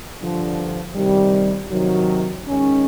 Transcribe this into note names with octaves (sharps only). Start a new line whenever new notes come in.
G2 D3 F3
C3 D#3 G3
C3 D#3 F#3
D#3 G#3 C#4